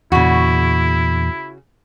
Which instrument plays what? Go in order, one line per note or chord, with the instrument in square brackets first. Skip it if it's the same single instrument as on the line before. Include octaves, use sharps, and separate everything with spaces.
[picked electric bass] E2 A#2 [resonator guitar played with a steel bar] C#3 F#4 [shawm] E4